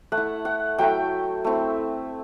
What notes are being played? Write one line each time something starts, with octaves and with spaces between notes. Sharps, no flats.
A3 F#5
E4
F#5
F#3 A3 E4 G5
A3 C4 E4